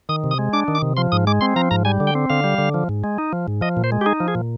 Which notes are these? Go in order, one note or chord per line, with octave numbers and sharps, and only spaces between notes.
D#3 D#6
C3
D#6
G#3
D4 D6
D#3
D6
C3
F3 C6
G#2 D#6
G#3 D6
C4 C6
F3 A#5
G#2 A#5
G3 G#5
D3
G5
C4
D3 F5
G3
D3
F3
G#2
G#3
D#4
F3
G#2
F3 D#5
A#2
C5
G#3
G4
D#4 G#4
F3
G#4
A#2